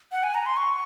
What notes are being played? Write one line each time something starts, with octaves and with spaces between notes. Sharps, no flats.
F#5
G#5
A#5
C6
C#6